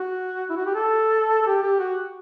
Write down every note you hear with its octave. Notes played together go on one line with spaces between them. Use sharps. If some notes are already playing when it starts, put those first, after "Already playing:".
Already playing: F#4
E4
F#4
G4
A4
A4
G4
G4
F#4